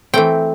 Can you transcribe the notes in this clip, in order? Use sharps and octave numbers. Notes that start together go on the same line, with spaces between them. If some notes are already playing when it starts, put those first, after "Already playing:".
E3 A3 C4 G5